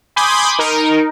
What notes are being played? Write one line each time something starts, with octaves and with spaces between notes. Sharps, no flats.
G#5 B5 C6 D6 D#6 G6
D#4 A#4